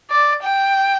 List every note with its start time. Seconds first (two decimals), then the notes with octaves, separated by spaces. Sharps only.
0.11 D5
0.43 G5